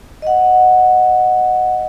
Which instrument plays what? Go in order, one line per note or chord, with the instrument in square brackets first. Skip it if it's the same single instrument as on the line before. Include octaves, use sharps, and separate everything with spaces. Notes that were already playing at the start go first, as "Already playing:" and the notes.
[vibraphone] D#5 F#5